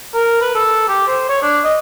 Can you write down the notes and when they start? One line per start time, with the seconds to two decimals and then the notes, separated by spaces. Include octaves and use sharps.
0.14 A#4
0.41 B4
0.55 A4
0.88 G4
1.08 C5
1.29 C#5
1.42 D4
1.64 D#5